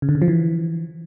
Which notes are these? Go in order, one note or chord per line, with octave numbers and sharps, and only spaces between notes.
C#3
D3
C#3
F3
E3